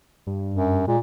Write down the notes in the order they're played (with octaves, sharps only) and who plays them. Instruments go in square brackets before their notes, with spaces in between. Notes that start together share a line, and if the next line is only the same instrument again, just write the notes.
[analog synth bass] G2
[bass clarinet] F#2
[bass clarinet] A#2 [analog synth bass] G#3